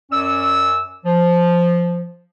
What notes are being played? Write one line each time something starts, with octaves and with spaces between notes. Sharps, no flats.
F#2 C#4 D5 E6
F3